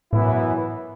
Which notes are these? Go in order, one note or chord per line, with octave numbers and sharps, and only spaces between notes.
F#2 A2 E3 B3 E4